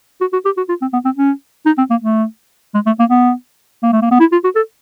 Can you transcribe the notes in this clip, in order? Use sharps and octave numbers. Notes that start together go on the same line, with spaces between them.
F#4
F#4
G4
F#4
F4
C4
B3
C4
C#4
D#4
C4
A#3
A3
G#3
A3
A#3
B3
A#3
A3
A#3
B3
E4
F4
F#4
A4